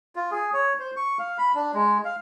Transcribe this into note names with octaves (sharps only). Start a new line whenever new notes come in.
F4
G#4
C#5
C5
C#6
F5
B5
D4
G#3
F5